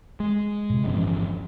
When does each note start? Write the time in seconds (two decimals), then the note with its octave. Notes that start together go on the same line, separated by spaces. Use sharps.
0.20 G#3
0.70 A2 C3
0.85 G1 E2 F3 C#4